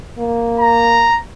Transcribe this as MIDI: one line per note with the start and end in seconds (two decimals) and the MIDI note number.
0.19 1.10 58
0.60 1.16 82